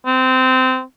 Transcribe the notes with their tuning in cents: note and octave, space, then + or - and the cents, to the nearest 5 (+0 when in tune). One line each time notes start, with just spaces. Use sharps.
C4 -20